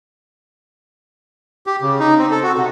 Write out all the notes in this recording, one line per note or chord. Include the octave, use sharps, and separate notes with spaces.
G4
C#3
D#4
C4
A4
F#4
C3